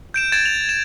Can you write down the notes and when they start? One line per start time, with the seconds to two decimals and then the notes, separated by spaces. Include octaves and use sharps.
0.14 G6 D7 E7
0.32 G#6 A6 D7 E7
0.46 F7
0.69 E7